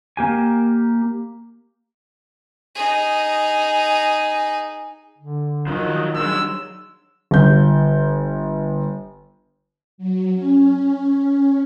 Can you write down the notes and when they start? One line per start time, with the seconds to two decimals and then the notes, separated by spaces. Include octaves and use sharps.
0.17 A#3 G4 G#5
2.75 D#4 G#4
5.18 D3
5.67 D#3 F3 F#3
6.15 G2 F#3 G#3 E6
7.31 G1 G6
9.98 F#3
10.32 C#4